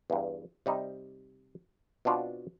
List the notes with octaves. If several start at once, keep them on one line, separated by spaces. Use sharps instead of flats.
E2 G2
C3 G3 D#4
B2 C4 D4 F4